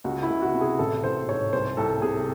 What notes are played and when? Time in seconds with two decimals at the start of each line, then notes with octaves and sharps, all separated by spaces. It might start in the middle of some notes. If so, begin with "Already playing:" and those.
0.04 C#2 F#4
0.23 E4
0.30 C#2
0.42 F#4
0.54 C3
0.61 G#4
0.79 A1 A4
1.04 A1 C5
1.28 G#2 C#5
1.53 C2 C5
1.77 C2 A4
2.02 C3 G#4